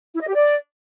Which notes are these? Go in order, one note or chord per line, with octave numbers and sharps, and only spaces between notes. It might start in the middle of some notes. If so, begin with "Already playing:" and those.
E4
D#5
G4
D5